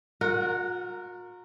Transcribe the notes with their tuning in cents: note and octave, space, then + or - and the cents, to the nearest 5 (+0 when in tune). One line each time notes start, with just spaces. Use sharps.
F#4 -45 A#4 -10 F#5 +0